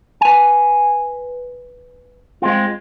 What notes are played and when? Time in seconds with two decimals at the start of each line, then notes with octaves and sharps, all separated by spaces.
0.21 B4 G#5
2.42 G#3 C4 F4